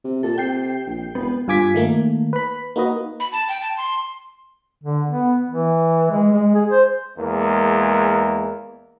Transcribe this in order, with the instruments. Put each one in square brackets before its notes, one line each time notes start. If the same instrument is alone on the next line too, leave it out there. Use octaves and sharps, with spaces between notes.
[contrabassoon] C3
[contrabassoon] A#2 [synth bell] A4
[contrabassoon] C3 [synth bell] G5 G6 C7
[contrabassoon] A#1
[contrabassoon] E1 [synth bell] B3
[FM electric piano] G2 F4 G#5 D6 G#6 B6
D#3 A3 A#3
B4 B5
A#3 D#4 F#4 B4 D#5
[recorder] B5
A5
G5
A5
C6
[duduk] D3
B3
E3
G#3
G#3
G#4
C5
[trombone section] E2 G#3 A#3 A#4